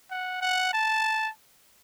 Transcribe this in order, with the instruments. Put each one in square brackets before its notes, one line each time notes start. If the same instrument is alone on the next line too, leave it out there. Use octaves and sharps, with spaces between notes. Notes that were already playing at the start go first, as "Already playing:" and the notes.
[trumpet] F#5
F#5
A5